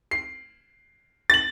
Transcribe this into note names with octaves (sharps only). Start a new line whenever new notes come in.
C7
A6 F#7